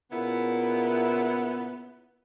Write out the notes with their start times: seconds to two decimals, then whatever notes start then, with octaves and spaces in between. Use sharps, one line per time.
0.11 A#2 C#3 B3 E4